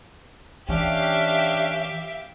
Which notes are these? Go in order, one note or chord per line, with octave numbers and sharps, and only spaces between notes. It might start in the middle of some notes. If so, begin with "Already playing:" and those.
E3 C#4 D4 G4 E5 F5